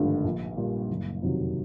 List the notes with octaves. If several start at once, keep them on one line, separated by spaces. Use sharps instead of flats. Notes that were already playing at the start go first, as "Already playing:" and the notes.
Already playing: G#1 G2 D3 F3 A3
A#1
A#2 G3
F#1
F2 C3 D#3 F#3